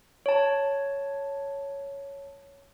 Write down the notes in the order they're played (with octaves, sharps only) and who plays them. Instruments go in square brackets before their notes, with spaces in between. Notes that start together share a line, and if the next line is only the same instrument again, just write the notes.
[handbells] C#5 A5